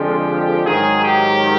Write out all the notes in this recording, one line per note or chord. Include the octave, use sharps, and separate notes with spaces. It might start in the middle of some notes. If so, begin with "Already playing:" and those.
Already playing: F2 D3 F3 G#3 G4
G#2 D#3 F#3 G#4
G4